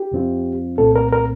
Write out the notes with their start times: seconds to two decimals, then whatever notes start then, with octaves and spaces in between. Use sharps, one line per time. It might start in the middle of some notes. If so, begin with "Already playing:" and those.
Already playing: G4
0.12 F2 C3 F3 C4 F4
0.78 C2 A#2 A3 C4 A4
0.96 A#4
1.13 A#4